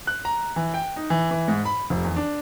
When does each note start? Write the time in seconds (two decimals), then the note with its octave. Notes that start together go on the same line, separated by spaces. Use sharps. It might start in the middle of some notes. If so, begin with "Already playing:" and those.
0.07 F#6
0.25 A#5
0.56 E3
0.74 G5
0.96 D#4
1.10 E3
1.31 E3
1.48 G#2
1.65 B5
1.90 F1
2.04 E2
2.16 D4